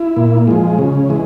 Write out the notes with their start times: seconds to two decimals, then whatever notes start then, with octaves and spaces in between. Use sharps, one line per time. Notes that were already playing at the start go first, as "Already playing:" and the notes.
Already playing: E4
0.16 A#2
0.47 F3 G#3
0.79 C#3
1.09 E3 G#3